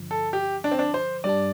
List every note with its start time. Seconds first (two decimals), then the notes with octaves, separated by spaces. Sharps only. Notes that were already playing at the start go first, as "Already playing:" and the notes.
Already playing: G2 D3 F3
0.11 A4
0.33 G4
0.64 D4
0.71 C4
0.79 D4
0.94 C5
1.24 G2 G3 D4 D5